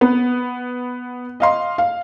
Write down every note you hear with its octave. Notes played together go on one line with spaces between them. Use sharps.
B3
D#5 F5 C6
F5